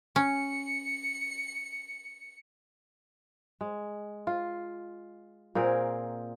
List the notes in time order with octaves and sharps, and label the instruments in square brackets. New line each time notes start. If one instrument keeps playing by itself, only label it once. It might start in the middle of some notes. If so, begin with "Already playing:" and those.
[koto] C#4 [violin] C#7
[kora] G#3
F4
A#2 C4 G#4 A#4